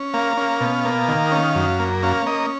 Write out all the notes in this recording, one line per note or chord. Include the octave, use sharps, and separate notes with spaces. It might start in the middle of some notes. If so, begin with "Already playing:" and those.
Already playing: C#4
A#3 F5
C#4
B2
A#3
D#3
C#4
F#2
A#3
C#4 F5
A#3 D#5